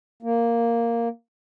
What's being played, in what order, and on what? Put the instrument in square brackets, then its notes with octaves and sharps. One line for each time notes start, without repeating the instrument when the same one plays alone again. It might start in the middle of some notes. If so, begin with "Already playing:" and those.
[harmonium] A#3